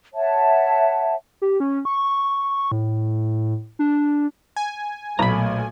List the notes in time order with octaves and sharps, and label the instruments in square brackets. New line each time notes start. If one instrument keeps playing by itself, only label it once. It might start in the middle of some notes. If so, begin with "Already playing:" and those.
[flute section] C#5 E5 F#5 A5
[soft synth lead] G4
C#4
C#6
A2
D4
[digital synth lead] G#5
[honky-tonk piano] B1 [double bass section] A#2 F#3 A3 [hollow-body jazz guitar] A#5 B5